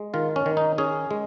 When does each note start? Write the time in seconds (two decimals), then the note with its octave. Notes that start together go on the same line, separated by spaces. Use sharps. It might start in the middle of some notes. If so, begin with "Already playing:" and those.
Already playing: G#3
0.14 D#3 F4
0.36 C#4
0.46 D#3
0.57 D#4
0.78 C#4 G#4
1.11 G#3